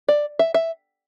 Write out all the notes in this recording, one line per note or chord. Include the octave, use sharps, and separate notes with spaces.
D5
E5
E5